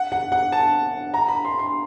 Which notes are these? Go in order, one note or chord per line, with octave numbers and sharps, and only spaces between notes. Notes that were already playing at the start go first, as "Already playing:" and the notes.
Already playing: F#5
F#5
F#5
A5
A#5
B5
C6
C6